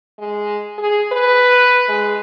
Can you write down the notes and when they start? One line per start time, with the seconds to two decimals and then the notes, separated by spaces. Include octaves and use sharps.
0.19 G#3
0.78 G#4
1.12 B4
1.89 G#3